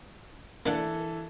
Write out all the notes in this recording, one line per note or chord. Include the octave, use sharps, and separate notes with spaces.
E3 A#3 D4 A4 F#5